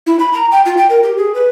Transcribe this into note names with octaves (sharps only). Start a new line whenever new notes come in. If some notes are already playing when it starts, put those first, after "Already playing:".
E4
B5
A#5
G5
F4
G5
A#4
G4
G#4
B4